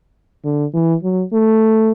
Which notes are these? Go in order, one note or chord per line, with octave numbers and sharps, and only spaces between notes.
D3
E3
F#3
A3